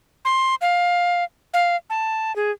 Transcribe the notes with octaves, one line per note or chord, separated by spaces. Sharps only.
C6
F5
F5
A5
G#4